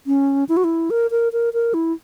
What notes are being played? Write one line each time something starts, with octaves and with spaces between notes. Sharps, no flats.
C#4
E4
F#4
E4
A#4
A#4
A#4
A#4
E4